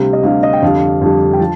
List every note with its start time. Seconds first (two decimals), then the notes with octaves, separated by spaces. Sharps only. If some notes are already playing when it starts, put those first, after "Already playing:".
Already playing: D2 C3 G3 F5
0.13 D#5
0.23 D2 C3 G3 F5
0.43 D#5
0.53 G5
0.62 F2 D3 G3 F5
1.01 F2 D3 G3
1.33 G5
1.40 F3 A5